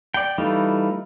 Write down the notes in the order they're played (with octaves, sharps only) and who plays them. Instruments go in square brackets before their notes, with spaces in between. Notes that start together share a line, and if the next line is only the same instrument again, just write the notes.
[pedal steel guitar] D5 G5
E3 G3 A3 D#4 F4